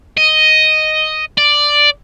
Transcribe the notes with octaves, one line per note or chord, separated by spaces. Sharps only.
D#5
D5